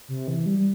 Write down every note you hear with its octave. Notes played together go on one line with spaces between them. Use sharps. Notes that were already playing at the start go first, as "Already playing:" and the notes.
C3
E3
G3
G3